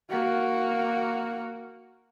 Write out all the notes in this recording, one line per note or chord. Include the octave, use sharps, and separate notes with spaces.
A#3 F#4